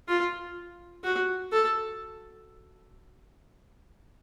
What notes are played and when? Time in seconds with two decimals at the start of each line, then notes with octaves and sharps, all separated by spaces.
0.08 F4
1.04 F#4
1.53 A4